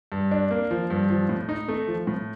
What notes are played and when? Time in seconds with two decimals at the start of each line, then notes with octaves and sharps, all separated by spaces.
0.12 G2
0.31 D4
0.51 A#3
0.71 F3
0.90 G2
1.10 F3
1.29 A2
1.49 D#4
1.68 A3
1.87 F3
2.07 A2